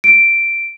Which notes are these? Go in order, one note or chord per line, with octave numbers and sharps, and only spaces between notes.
D7